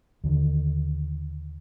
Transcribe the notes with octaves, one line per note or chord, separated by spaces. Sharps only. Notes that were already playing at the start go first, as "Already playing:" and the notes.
D#2 D3 D#3